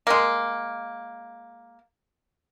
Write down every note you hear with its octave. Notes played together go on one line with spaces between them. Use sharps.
G#3 A#3